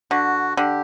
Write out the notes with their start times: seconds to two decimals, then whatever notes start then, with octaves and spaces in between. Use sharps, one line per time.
0.11 D3 F#4
0.57 D3 G4